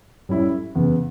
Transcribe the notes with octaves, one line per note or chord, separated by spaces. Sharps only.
A2 G3 C#4 E4
E2 C#3 E3 B3